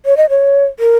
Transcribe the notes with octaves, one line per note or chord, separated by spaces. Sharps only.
C#5
D#5
C#5
A#4